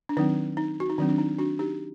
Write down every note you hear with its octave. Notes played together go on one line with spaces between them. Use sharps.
D4
D#3 F#3 C4 D#4
D#4
F#4
D#4
D#3 F#3 C4 D4
D4
D#4
D4 F#4
D#4 G4